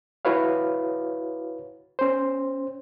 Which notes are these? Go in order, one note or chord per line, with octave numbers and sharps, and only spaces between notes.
E4 F#4 B4 C#5 F5
C#4 C5